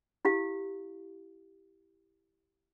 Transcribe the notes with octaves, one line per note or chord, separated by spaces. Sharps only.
E4 G4 F5